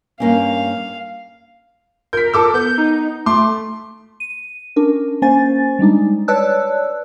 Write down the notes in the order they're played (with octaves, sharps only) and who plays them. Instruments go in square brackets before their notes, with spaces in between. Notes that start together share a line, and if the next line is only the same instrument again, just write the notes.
[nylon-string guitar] G2 A#3 C#4 [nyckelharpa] F5
[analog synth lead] A#4 [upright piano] G6 B6
[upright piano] A4 D6 E6
[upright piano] B3 [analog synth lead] G6
[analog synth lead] D#4
[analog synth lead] A3 [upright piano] C6 D6
[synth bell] D#7
C#4 D4 A#4
A#3 C#4 C5 G#5 A6
G3 G#3 D4 D#4
B4 C#5 D5 A5 E6 F#6